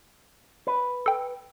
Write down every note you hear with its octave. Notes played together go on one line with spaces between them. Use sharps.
B4
A4 G5